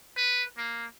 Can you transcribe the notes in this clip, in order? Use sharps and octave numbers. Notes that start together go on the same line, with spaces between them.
B4
A#3